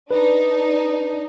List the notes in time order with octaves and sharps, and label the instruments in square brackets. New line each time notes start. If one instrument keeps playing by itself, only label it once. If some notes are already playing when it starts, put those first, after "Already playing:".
[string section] D4 D#4 [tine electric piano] B4